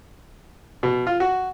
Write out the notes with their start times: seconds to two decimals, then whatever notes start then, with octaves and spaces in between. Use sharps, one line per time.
0.83 B2
1.07 F4
1.20 F#4